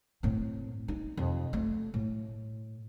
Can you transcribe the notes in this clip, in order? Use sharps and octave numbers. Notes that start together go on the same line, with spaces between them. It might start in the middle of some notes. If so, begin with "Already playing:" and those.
A2 C4
D#4
F2 C3
A3
A2